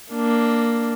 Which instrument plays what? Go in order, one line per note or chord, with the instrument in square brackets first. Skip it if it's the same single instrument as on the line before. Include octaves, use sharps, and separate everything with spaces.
[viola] A#3 D4